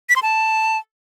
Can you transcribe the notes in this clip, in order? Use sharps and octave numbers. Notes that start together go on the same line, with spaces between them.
B6
C6
A5